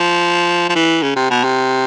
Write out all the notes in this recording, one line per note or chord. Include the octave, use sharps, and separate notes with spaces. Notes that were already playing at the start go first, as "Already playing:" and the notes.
Already playing: F3
F3
E3
C#3
C3
B2
C3